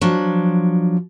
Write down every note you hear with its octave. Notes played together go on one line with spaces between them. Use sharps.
F3 F#3 D4